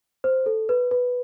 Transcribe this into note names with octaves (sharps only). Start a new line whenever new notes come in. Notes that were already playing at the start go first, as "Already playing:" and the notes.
C5
A4
B4
B4